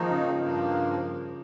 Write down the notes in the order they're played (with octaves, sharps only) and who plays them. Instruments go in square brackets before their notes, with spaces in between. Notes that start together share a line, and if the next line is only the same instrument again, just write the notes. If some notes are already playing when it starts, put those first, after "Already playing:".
Already playing: [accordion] G#2 D#3 A#3 D#4 [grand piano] F3
[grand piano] C#3
[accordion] G2 F3 A#3